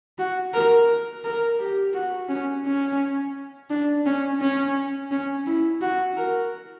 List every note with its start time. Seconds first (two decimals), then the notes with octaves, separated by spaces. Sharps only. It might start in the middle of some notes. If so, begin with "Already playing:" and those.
0.18 F#4
0.54 A#4
1.24 A#4
1.59 G4
1.94 F#4
2.29 C#4
2.65 C#4
3.70 D4
4.06 C#4
4.41 C#4
5.11 C#4
5.46 E4
5.81 F#4
6.17 A#4